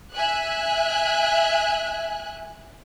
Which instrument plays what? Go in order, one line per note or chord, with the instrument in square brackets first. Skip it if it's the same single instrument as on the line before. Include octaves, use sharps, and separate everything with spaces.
[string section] E5 G#5 F#6